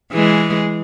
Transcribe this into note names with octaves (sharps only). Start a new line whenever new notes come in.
E3 G#3